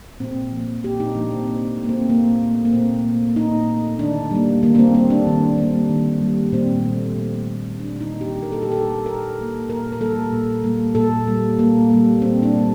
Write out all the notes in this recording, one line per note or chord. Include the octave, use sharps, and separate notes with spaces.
A#2 C4
F3 A#3
A#2 G4
D#4
F3 A#3 D4
C4
A#2 C4
A3
A#3
C4
A#2 A#3
A3
A#3
A#2 C4
A3
A#2 D#4
A3
D#3 D4
G3 A#3
D#3 A#3
A#3
C4
G3 A#3 C4
D4
D#3
G3 A#3
D#3
G3 A#3
A#2 C4
A3
A#2
A3
A#2 D4
D#4
A3
G4
A#2 A#4
A4
G4
A3 A4
A#2 A#4
G3 A#3
A#2 A#4
A#4
G3 A#3 A4
A#2
G3 A#3
A#2 A4
G3 A#3
A#2 A#3
G3 A#3
A#2 C4
D4
G3 A#3